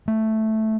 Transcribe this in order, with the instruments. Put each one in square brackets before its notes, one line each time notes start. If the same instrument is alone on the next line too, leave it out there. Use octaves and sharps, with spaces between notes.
[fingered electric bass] A3